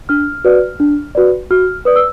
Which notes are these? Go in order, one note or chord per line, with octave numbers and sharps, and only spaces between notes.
D4 F6
F#4 B4 D5
D4
F#4 B4 D5
F#4 F6
B4 D5 D#6
E6